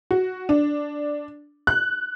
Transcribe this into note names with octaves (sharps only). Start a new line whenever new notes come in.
F#4
D4
F#6